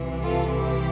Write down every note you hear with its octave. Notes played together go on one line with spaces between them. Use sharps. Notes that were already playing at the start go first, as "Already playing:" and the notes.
Already playing: C2 C3 E3
F4 A4
E4 G4